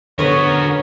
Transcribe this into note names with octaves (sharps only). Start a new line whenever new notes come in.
D3 B3 F#4 A#4 B4 C#5